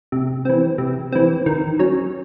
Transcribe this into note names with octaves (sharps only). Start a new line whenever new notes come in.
C3
E3 C4
C3
E3 C4
D#3
F#3 C#4